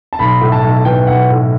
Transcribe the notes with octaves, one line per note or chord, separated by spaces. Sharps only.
A5
B1 B5
A2
A5
B1
E3 G5
B1 F#5
A2